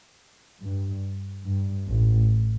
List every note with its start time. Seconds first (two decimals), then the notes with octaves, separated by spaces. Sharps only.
0.62 G2
1.45 G2
1.87 A1 A2